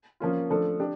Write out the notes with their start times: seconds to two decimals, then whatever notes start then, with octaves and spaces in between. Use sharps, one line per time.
0.20 F3 A#3 C#4 F4
0.50 F3 A3 D4 A4
0.80 D4 G4